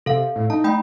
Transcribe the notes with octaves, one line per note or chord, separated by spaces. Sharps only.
C3 A4 F5
A2
D#4 A5
A3 G5 B5